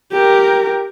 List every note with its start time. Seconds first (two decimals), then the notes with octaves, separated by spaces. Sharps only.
0.12 G4 A#4